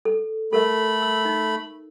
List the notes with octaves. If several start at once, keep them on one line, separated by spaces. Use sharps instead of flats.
A4
A3 A4 A#4 E5 B5
E6
D#4